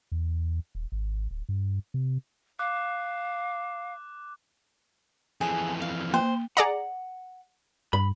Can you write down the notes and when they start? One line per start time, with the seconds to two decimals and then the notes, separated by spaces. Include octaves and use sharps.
0.12 E2
0.75 D#1
0.92 G#1
1.31 D1
1.49 G2
1.94 C3
2.59 F5 D6 F#6
5.41 F2 E3 G#4
5.82 F5
6.14 A#3 C5
6.57 G#4 D5 F#5 A#5
7.93 G2 B5